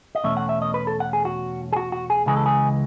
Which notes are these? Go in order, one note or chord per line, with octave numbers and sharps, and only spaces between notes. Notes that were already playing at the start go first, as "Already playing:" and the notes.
D#5
E2 B2 A3 C#4 E5
F#5
E5
D#5
B4
A4
F#5
G#4
F#4
G#4
F#4
F#4
G#4
C#2 C#3 E3 G#3 G#4
A4
G#4